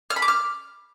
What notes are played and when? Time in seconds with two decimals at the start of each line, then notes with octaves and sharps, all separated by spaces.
0.10 F6
0.16 B5
0.22 D6
0.28 F6